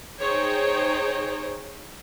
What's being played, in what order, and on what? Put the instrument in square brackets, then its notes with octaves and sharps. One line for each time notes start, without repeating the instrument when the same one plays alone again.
[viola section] D#4 G#4 C5 C#5 G5